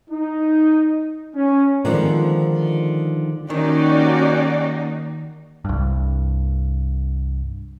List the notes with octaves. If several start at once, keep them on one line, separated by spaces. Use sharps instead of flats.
D#4
C#4
D3 D#3 F3 G#3 C4 B4
D#3 A#3 C#4 D#4 F#4 G4 D5
C2 G2